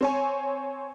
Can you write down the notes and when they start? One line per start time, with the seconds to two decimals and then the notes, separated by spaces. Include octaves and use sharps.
0.01 C4 C#5 G#5